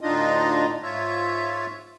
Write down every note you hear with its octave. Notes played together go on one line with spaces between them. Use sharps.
D2 A2 D4 D#4 F4 D#5
G#2 F4 C#5 E5